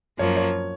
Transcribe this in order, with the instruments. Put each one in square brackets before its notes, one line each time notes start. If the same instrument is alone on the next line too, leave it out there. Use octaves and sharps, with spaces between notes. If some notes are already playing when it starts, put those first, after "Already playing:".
[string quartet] F#2 F3 A#3 [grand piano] C#5
[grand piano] C#5